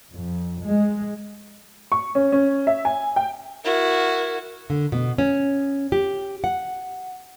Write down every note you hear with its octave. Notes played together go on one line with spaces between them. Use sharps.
F2
G#3
C#6
C#4
C#4
E5
G#5
G5
E4 F#4 A#4
D3
B2
C#4
G4
F#5